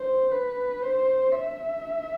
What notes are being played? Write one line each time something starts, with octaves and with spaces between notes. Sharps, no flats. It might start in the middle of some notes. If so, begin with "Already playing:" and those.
Already playing: C5
B4
C5
E5